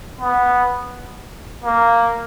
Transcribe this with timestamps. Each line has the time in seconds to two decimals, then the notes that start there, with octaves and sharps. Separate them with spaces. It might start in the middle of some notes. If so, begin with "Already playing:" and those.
0.19 B3
1.64 A#3